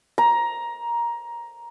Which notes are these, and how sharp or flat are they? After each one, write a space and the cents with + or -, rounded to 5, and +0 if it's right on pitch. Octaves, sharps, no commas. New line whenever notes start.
A#5 +15